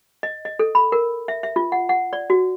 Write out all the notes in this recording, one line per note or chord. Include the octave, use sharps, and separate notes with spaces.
D#5
D#5
A4
B5
A#4
E5
E5
F4
F#5
F#5
D5
F#4